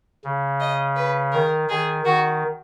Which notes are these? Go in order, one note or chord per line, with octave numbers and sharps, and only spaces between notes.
C#3
D#5
B4
D#3 A#4
D#3 G#4
D#3 F#4